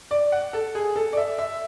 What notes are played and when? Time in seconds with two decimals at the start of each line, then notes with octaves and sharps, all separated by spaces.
0.11 D5
0.32 F#5
0.53 A4
0.75 G#4
0.96 A4
1.13 D5
1.17 E5
1.38 E5